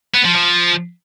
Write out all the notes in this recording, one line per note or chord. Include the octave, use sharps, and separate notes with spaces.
B3
F3
F3